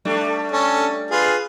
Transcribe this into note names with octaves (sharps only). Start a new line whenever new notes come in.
G3 A3 D4
C#4 A4
F4 G#4 B4